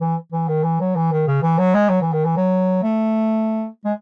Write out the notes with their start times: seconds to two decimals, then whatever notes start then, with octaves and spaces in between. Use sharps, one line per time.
0.01 E3
0.32 E3
0.48 D#3
0.64 E3
0.81 F#3
0.96 E3
1.12 D#3
1.28 C#3
1.42 E3
1.59 F#3
1.74 G#3
1.90 F#3
2.01 E3
2.13 D#3
2.25 E3
2.37 F#3
2.83 A3
3.85 G#3